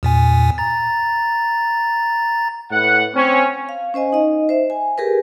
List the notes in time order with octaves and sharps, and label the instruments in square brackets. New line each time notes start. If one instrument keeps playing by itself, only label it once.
[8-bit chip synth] E2 A#2 G#5
A#5 A6
[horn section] A2 B4 F#5
C4 C#4
[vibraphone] F5
C#4 C5 D#5 G#5
D#4 D#5
C5 E5
G#5
G4 G#4 A#4 B4